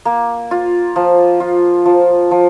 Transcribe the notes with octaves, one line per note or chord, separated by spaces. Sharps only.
A#3
F4
F3
F4
F3
F3